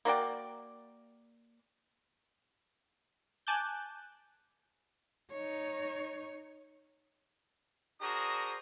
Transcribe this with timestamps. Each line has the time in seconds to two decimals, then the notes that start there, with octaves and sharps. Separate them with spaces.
0.05 A#3 F#4 D5 G5
3.47 G#5 A5 D6 F#6 G6
5.31 D#4 C#5
8.01 D4 F#4 G#4 A#4 C5 D#6